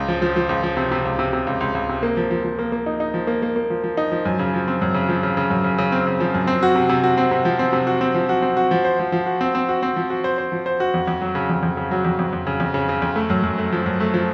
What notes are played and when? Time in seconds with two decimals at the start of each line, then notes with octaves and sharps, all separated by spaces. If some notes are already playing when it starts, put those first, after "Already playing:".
Already playing: C#2
0.08 F3
0.22 F3
0.36 F3
0.49 C#2
0.63 F3
0.77 C3
0.92 C3
1.05 C#2
1.19 C3
1.33 C3
1.47 C#2
1.60 C#2
1.75 C#2
1.89 C3
2.03 A#3
2.17 F3
2.31 F3
2.44 F3
2.59 A#3
2.72 A#3
2.86 D#4
3.00 D#4
3.14 F3
3.27 A#3
3.42 A#3
3.56 A#3
3.70 F3
3.84 F3
3.97 D#4
4.12 F3
4.25 F#2
4.39 C#3
4.54 F3
4.68 C4
4.82 F#2
4.94 C#3
5.09 F3
5.23 C#3
5.37 C#3
5.50 F#2
5.64 C#3
5.78 C#3
5.92 C4
6.07 C#3
6.20 F3
6.34 F#2
6.47 C4
6.63 F#4
6.76 C3
6.89 C3
7.04 F#4
7.17 C4
7.31 C3
7.45 F3
7.59 C4
7.73 C3
7.87 F#4
8.01 C4
8.15 F3
8.29 F#4
8.42 C4
8.57 F#4
8.71 F3
8.85 C5
8.99 F3
9.12 F3
9.26 F#4
9.41 C4
9.55 C4
9.69 F#4
9.83 C4
9.96 F3
10.10 F#4
10.24 C5
10.38 C5
10.52 F3
10.66 C5
10.80 F#4
10.94 F2
11.08 F2
11.21 F#3
11.35 C#3
11.50 F2
11.63 F2
11.77 C#3
11.91 F#3
12.05 F2
12.19 F2
12.33 F2
12.47 C#3
12.60 F2
12.74 C#3
12.89 C#3
13.02 F2
13.16 A3
13.30 F#2
13.44 F#2
13.58 A3
13.72 F3
13.86 F#2
14.00 A3
14.14 F3